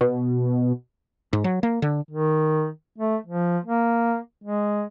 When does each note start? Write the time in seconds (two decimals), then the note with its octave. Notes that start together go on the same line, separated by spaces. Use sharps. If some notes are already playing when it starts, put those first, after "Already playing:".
0.01 B2
1.33 G#2
1.44 F#3
1.63 A#3
1.82 D3
2.10 D#3
2.98 A3
3.26 F3
3.65 A#3
4.44 G#3